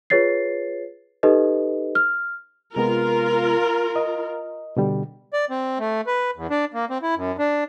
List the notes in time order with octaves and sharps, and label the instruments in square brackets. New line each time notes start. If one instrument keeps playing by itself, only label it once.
[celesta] F4 G#4 B4 C#5 A6 C7
D#4 G4 A4 B4 D#5
F6
[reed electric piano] C3 G#3 B3 [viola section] F4 A#4
[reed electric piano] D#5
B2 D3 G3
[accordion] D5
C4
A3
B4
E2
D4
A#3
C4
E4
F#2
D4